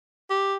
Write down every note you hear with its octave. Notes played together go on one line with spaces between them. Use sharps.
G4